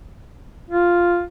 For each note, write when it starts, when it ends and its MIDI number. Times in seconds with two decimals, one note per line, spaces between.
0.71 1.23 65